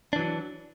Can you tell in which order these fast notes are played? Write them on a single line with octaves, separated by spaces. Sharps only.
D4 E3 F#3